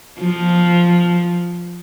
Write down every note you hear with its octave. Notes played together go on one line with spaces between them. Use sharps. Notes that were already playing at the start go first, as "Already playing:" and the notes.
F3